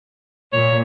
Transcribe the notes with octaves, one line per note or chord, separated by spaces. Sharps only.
A#2 C#5